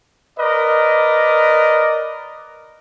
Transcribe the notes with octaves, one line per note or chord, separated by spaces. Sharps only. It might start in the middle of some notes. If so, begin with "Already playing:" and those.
A#4 B4 D5 D#5